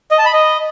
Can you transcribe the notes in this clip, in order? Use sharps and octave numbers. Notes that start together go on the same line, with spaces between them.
D#5
A5
B5
D#5